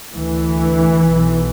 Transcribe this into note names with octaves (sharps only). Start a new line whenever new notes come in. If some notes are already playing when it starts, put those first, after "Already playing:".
D2 E3
B1 B2